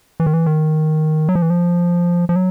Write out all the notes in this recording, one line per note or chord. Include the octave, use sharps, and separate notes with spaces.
E3
D#3
E3
D#3
F#3
F3
E3
F3
F3
F#3